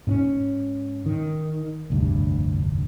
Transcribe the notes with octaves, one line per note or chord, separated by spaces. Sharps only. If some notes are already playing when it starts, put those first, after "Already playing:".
G#2 C4 C#4
D#3
F1 D2 G2